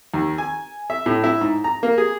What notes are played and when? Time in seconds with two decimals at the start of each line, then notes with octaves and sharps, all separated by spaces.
0.14 D#2
0.38 G#5
0.90 E5
1.06 A2
1.24 E4
1.41 G#2
1.64 A#5
1.83 A#3
1.98 G#4